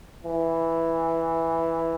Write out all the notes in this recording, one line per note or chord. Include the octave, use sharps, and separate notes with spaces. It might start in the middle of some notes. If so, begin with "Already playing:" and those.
E3